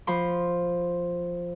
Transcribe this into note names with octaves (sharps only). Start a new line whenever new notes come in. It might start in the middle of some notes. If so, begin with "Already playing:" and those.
F3 B5 C6